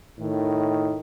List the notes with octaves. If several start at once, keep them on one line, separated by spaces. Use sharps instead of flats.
A2 D#3